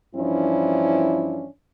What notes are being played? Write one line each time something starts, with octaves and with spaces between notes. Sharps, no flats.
G2 E3 F3 C#4 D4 E4